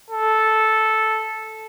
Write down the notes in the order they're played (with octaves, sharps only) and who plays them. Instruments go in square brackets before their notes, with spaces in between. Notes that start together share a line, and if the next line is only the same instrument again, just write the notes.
[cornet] A4